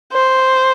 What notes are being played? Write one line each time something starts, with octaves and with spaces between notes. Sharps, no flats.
C5